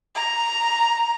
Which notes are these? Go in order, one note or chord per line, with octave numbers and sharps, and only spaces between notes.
A#5